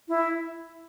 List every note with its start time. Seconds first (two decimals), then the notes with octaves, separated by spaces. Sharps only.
0.09 E4